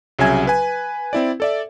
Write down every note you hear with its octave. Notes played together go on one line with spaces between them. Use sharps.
C2 C#3 F#3 E5 G#5 G#6
B4 G#5
C4 E4 D5
A4 D5 E5